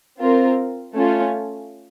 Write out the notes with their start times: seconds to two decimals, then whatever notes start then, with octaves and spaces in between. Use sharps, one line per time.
0.20 C4 F4 A#4
0.96 A3 C#4 F4